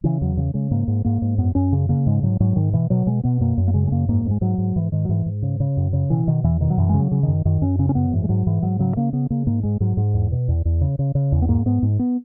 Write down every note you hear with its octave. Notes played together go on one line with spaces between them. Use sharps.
C#3 E3
E2 F#3
C#3
C#3 G#3
G#2 A#3
G#2
G#2 A#3
G#2
F#2 B3
F#2 C#4
C#3
C#3 A#3
G#2 G#3
G#2 F#3
G#2 F#3
G#2 D#3
B2 E3
B2 F#3
B2 G#3
B2 B3
F#2 A#3
F#2
A#3
C#3 G#3
G#3
F#2 A#3
G#2 A#3
G#2
G#3
G#2 F#3
G#2
G#2 E3
G#2 D#3
F#3
G#2 E3
G#2
C#3
C#3
F#2
C#3
B2 E3
B2 D#3
E2 E3
B2 D#3
F#3
F#2 E3
C#3 G#3
F#3
C#3
F#2 D#3
F#2 D#3
F#2 C#4
C#3 C#4
C#4
F#2 B3
G#2 E3
G#3
G#2 F#3
G#2 E3
G#2 F#3
C#3 F#3
C#3 A#3
C#3 B3
C#3 A#3
G#2 A#3
G#2 G#3
G#2 F#3
G#2
E2
B2
E2
E2
C#3
C#3
C#3
E2
B3
G#2 A#3
G#2 B3
G#2
B3